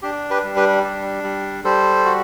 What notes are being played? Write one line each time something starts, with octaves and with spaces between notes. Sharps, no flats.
D4 G4
G4 B4
G3
G4 B4
D4
G3
G3 A4 C5
F#4